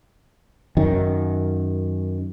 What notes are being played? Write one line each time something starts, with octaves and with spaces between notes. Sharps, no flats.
F#2 D#3